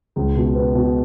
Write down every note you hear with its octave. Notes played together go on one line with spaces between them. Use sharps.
C#2
B2
B3
B2